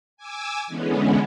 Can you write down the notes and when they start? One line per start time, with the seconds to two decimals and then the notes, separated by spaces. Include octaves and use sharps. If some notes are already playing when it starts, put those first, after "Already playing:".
0.17 G#5 D6 E6
0.67 D3 E3 G#3 B3 C#4